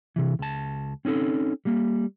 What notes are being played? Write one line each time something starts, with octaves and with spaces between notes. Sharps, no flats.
C3 E3
C#2 A5
C4 C#4 D#4 A4
G3 A#3